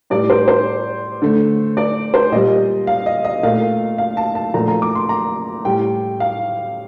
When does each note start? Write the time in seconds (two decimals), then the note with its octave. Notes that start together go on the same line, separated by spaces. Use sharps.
0.10 A2 G3 D5
0.30 C5
0.48 C5
1.22 D3 A3
1.77 D5
2.14 C5
2.32 A#2 G3 D#5
2.87 F5
3.06 D#5
3.24 D#5
3.43 A#2 A3 F5
3.98 F5
4.17 A5
4.35 A5
4.54 A#2 F3 A3 A#5
4.68 A#5
4.82 D6
4.95 C6
5.09 A#5
5.65 A2 G3 G5
6.20 F5